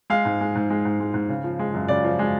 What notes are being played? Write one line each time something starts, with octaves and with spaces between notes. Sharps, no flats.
G#3 F5
G#2
G#3
G#2
G#3
G#2
G#3
G#2
C#3
F3
G#3
F#2
C#3 D5
F3
G#3